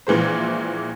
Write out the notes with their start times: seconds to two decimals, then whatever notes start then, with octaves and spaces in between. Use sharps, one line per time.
0.07 A#1 A#2 E3 G#3 C5